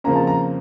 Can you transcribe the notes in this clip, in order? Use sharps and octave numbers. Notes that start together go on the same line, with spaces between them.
F2 C#3 F3 A#3 C#4 A#5
A5
A#5